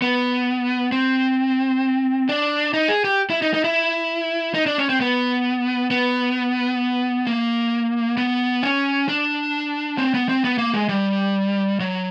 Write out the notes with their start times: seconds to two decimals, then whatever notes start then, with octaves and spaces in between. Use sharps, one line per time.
0.02 B3
0.92 C4
2.29 D4
2.74 D#4
2.89 G#4
3.04 G4
3.30 E4
3.42 D#4
3.54 D#4
3.64 E4
4.54 D#4
4.66 D4
4.78 C#4
4.89 C4
5.01 B3
5.91 B3
7.27 A#3
8.17 B3
8.63 C#4
9.09 D4
9.98 C4
10.14 B3
10.29 C4
10.44 B3
10.58 A#3
10.74 G#3
10.89 G3
11.80 F#3